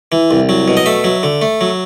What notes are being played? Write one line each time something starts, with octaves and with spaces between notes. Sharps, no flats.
E3
C2
F#3
B2
D#5
A3 E5
F#3
D3
A3
F#3